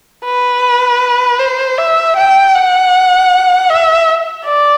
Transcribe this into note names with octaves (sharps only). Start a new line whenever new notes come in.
B4
C5
E5
G5
F#5
E5
D5